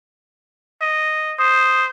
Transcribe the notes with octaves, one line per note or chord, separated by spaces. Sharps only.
D#5
C5 D#6